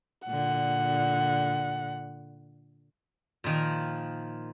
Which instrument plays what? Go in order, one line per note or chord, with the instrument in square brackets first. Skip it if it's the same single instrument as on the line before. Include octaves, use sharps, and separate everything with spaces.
[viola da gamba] A#2 D3 [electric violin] F#5
[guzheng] A#2 D#3 F3